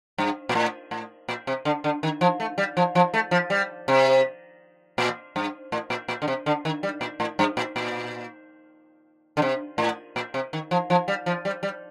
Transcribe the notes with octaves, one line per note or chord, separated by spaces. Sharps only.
G2
A#2
A2
A2
A#2
C3
D3
D3
D#3
F3
A3
G3
F3
F3
A3
F3
G3
C3
A#2
G2
A2
A#2
A#2
D3
C3
D3
D#3
G3
A#2
A2
G2
A#2
A#2
D3
C3
A2
A#2
C3
D#3
F3
F3
G3
F3
G3
G3